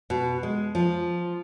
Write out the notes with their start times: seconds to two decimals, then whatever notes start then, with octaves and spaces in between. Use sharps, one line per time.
0.10 B2
0.43 G#3
0.75 F3